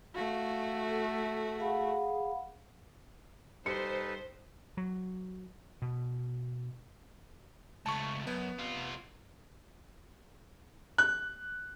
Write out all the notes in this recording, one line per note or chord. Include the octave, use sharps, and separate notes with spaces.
A3 F#4 F5
A4
G#4 F5 F#5 B5
G3 D#4 A4 B4 C5 C#7
F#3
B2
C#2 A3 A5 C#6
F#2 B3
C3 F4
F#6